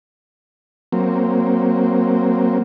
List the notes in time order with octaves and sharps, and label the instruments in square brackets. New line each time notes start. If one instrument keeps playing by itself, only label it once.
[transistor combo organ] F#3 A#3 C4